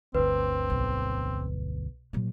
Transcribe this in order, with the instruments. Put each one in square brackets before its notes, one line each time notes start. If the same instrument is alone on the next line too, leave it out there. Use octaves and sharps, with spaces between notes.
[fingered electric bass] G1 D2 [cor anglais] C4 [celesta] B4
[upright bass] B1
A#2 F#3